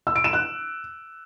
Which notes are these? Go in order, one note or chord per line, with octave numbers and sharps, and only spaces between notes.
E6
D7
E7
F#6